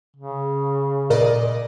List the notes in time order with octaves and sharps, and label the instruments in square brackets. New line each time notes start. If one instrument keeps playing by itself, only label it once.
[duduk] C#3
[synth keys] A#2 D5 D#5 [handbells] A#4